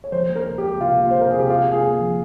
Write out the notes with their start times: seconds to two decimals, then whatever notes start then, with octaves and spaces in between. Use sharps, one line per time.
0.04 C#5
0.12 F3 C5
0.29 A#3
0.35 A#4
0.46 C#2
0.58 G4
0.64 C#2
0.80 C3 F4
0.98 A#3
1.11 C5
1.15 C3
1.20 A#4
1.30 C3 G#4
1.39 G4
1.49 C3 F4
1.67 C3 G#4
1.83 A#3
2.01 F3